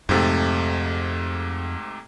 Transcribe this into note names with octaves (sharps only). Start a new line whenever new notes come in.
F2 G#2 C3 A3